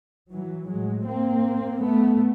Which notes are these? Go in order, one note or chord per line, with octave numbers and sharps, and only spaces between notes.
E3 F#3
A2 F#3 G#3
A#3 C4
A3 B3